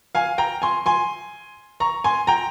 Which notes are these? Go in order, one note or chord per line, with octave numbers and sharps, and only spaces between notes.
F5 G#5
G5 A#5
G#5 C6
G#5 C6
A#5 C#6
G#5 C6
G5 A#5